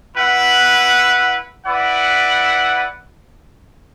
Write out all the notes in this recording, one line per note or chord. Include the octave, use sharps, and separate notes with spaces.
E4 B4 F#5
E4 B4 D5 F#5